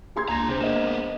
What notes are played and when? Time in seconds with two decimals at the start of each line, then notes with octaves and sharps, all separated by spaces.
0.16 G#4 C6 G#6
0.29 C#2 A#3 D4 A#5 A#6
0.49 C3 C4 D4 G#4 C5
0.61 A#3 B3 D#5 E7